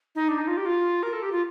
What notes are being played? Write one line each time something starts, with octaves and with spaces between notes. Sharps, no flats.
D#4
D4
D#4
F4
G4
F4
A#4
A4
G4
F4